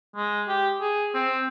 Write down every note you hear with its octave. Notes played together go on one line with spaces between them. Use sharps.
G#3
G4
G#4
C4